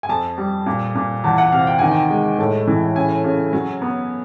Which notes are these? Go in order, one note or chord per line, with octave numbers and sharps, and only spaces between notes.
G#5
F2 A5
G3
A#2
A#2
E2 A5
F#5
C3 F5
G5
D#3 G#5
G5
G#3
A2
E3
C#3 G#5
C#3
F#3
B3